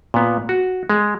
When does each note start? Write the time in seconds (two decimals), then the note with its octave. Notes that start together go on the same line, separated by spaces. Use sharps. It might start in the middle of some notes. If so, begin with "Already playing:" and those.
0.14 A#2 B3
0.49 F#4
0.90 G#3